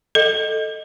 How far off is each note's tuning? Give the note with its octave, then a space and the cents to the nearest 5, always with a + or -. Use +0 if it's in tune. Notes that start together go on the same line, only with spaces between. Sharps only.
A4 +0 D#5 +0